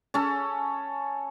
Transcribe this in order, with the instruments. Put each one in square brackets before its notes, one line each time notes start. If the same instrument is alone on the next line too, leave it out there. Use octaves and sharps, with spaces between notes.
[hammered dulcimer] C#4 A4